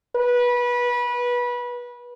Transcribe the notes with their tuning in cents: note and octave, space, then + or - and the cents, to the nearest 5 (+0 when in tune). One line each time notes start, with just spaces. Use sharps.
B4 -20